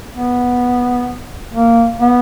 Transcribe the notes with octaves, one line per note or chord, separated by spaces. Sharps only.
B3
A#3
B3